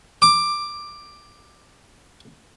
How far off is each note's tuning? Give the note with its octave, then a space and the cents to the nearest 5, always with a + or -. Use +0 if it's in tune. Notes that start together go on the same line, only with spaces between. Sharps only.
D6 +10